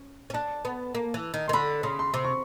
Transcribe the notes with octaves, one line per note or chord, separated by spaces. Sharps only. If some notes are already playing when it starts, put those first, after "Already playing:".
Already playing: C#4
C#4
D4 A5
B3
A#3
E3
D#3
D#3 C6
D3 B5
C#3 C6
C6
C3 C6
C#6